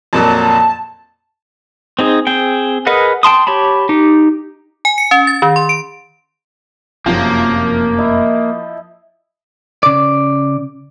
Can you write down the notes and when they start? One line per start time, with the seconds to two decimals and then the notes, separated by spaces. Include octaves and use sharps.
0.13 F2 A#2 F#3 A5
1.99 C4 D#4 G#4
2.27 C4 G#4 G5
2.87 G#4 A#4 B4 D#5 F#5
3.23 G5 A5 C6 D#6
3.47 G4 C#5 A5 B5
3.89 D#4 G4
4.85 G#5
4.98 C#7
5.11 C#4
5.27 A6
5.42 D#3
5.56 C6
5.69 D7
7.06 F1 F#2 C3 F3 A#3
7.98 E4 D#5
9.83 C#3 D5